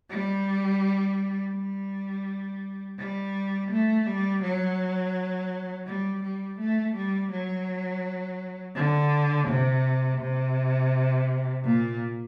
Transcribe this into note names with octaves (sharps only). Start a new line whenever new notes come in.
G3
G3
G3
A3
G3
F#3
G3
G3
A3
G3
F#3
D3
C3
C3
A#2